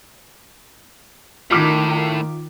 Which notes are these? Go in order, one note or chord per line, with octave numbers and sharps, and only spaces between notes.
A2 D#3 F4 D6 B6